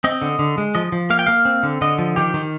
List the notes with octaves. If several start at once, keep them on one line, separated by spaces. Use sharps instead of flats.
C4 D#5
D3
D3
G#3
F3 D#5
F3
A#3 F5
G5
A#3 F5
C4
D3
D3 D#5
F3
D#3 G4
D#3